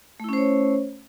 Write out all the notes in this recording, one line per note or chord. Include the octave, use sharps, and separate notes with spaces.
A3 C#4 E4 C5 C#5